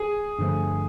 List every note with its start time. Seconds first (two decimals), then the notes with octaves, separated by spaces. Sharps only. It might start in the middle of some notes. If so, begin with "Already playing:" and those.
Already playing: G#4
0.38 G2 D3 F3 A3